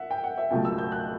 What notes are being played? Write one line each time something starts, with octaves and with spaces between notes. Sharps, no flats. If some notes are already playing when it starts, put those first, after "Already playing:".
Already playing: E5 F#5
G5
F#5
E5
C#2 B2 F#3 A3 G5
E6
G6
F#6